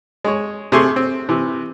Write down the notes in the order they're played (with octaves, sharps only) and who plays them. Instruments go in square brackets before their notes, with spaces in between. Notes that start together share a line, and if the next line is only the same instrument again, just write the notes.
[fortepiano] G#3 C#5
C3 A3 G#4 C6 C#6
C4
C3 E3